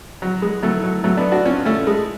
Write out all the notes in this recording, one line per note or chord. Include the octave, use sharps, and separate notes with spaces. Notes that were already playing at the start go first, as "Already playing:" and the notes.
F#3
G#3
F#3 A3
F#3
F#3 A3
B3 D4
D4 F#4
C#4 F4
A3 C#4
G#3